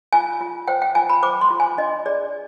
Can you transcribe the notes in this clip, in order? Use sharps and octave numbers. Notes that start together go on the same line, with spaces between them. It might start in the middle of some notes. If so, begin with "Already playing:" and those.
F4 G#5
F4
C5 G5
G5
F4 G#5
B5
C5 D6
C6
F4
G#5
D4 D#5
G#4 D5